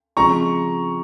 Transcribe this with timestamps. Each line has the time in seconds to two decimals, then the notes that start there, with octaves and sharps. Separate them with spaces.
0.17 C#3 F3 G#3 C4 A#5 C#6